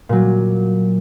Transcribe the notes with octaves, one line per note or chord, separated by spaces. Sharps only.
A#2 F#3